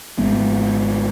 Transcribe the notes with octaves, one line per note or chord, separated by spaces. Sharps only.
G#1 G#3 B3